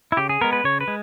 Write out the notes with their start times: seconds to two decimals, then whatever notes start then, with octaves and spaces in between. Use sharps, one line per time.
0.12 E4
0.17 C#3 G4
0.29 G#4
0.41 G#3 B3 A#4
0.53 B4
0.64 C#3 C#5
0.81 B4
0.88 G#3